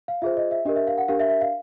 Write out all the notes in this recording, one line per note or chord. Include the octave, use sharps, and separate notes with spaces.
F5
F4 G#4 C5 E5
D#5
E5
D4 G4 A#4 D#5
E5
F5
F#5
D4 G4 A#4 F5
E5
E5
F5